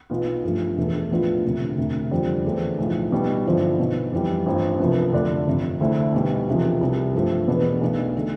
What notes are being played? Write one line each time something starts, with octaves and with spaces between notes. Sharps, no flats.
B1 B2 B3 F4
G2 F3 A3
E1 E2 B2 A3
A2 F3 B3 D4 F4
E1 D2 C3
E1 D2 C3
F2 D3 G3 C4 F4
E2 D3 A3 C4
B1 A2 F3
B1 B2 G3
G2 D3 F3 C4 E4
B1 B2 B3
F2 E3 G3
A1 G2 F3 C4
C2 C3 F3 B3
F2 D3 A3 D4
G1 F2 C3
D2 D3 A3 C4 E4
B1 B2 G3
E1 E2 C3 F3
C2 C3 E3 G3
G2 F3 A3 C4
E1 E2 B2 B3 D4
B1 B2 A3 D4
D3 A3